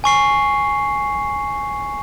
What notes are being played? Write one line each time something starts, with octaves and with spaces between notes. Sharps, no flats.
G#5 C#6 C7